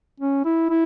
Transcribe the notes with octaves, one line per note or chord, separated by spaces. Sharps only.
C#4
E4
E4